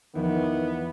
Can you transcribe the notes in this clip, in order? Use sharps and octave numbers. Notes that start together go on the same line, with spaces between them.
E2 D#3 F3 B3